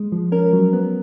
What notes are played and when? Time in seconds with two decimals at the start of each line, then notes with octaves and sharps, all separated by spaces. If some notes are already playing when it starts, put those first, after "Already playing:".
Already playing: G#3
0.12 F3
0.32 C#4 A#4
0.53 F#3
0.73 B3